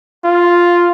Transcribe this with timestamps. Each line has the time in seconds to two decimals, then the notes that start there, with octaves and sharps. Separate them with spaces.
0.24 F4